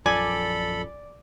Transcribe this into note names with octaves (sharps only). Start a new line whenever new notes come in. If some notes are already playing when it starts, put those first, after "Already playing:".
A#1 F#2 F3 A4 D5 G#5 B5